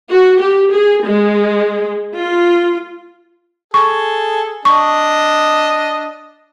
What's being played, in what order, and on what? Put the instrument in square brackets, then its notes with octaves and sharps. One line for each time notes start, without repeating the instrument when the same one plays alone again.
[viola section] F#4
G4
G#4
G#3
F4
[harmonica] G#4 A4 [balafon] C#6
[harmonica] D4 D#5 [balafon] C#6